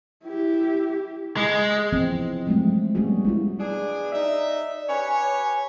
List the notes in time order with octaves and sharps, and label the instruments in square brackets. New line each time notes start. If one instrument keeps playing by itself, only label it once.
[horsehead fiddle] E4 G4
[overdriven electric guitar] G#3
[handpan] E3 F3 B3 C4
F3 F#3 G#3 A3 C4
G3 A3 B3 C#4 F#4 G#4
G#3 E4 F4
[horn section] B2 D4 G#4
[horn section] D#4 E5 [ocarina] D5
[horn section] G4 B4 C#5 [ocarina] G#5